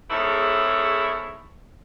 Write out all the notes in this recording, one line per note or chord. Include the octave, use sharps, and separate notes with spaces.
E2 G#2 E4 A4 C#5